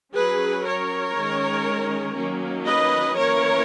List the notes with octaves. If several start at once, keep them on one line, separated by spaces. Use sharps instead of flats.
F#3 C#4 G#4 B4
A#4 C#5
D#3 G#3 C#4
D#3 F#3 A#3 C#4
B4 D#5
E3 A#3 C#4 A#4 C#5